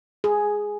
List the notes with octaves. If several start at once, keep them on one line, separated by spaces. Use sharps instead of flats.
G#4